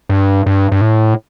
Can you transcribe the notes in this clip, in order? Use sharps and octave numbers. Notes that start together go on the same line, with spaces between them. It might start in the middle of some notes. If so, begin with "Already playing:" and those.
G2
G2
G2
A2